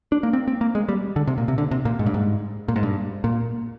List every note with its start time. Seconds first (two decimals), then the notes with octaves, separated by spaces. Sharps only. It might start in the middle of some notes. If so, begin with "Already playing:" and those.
0.12 D4
0.23 A#3
0.33 C4
0.48 C4
0.61 A#3
0.75 G#3
0.89 G3
1.16 D3
1.27 C3
1.38 A#2
1.48 C3
1.58 D3
1.71 C3
1.85 A#2
1.99 G#2
2.06 G2
2.14 G#2
2.68 A#2
2.76 G#2
2.83 G2
3.24 A#2